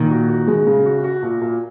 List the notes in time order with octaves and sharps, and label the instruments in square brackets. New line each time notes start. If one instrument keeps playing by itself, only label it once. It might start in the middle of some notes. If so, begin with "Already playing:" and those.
Already playing: [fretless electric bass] A#2 D#3
[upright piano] F#4
F#4
G#3
C#3
F#4
F#4
A#2
A#2